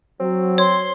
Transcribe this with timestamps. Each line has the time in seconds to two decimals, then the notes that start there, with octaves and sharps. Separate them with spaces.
0.20 F#3 C4
0.58 C#5 C6